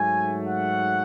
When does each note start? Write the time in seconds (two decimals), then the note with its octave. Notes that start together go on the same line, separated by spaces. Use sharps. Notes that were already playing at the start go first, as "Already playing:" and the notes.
Already playing: G#2 F#3 A3 G#5
0.47 F#5